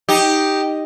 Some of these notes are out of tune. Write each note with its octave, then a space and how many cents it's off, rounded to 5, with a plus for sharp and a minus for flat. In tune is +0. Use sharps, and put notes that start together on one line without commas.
D#4 +0 G4 +0